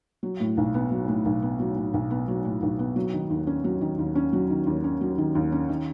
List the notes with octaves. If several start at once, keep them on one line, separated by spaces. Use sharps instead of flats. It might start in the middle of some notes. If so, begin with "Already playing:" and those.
F#3
A2
B1
B3
F#3
A2
B1
B3
F#3
A2
B1
B3
F#3
A2
B1
B3
F#3
D#3
D#2
C#4
F#3
D#3
D#2
C#4
F#3
D#3
D#2
C#4
F#3
D#3
D#2
C#4
D#3